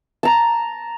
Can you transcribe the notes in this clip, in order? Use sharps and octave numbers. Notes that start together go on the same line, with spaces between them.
A5 A#5